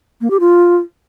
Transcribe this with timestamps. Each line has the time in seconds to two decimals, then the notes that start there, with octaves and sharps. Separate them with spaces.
0.21 A#3
0.31 G4
0.40 F4